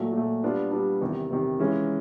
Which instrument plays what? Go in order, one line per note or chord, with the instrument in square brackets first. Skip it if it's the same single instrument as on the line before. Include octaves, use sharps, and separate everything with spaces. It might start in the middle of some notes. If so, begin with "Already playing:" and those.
Already playing: [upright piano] A#2 F#3 A3
A#2 F#3 A3
G3 B3 D4 F4
G3 B3 D4 F4
E2 C3 D#3
E2 C3 D#3
E3 G#3 C#4 F4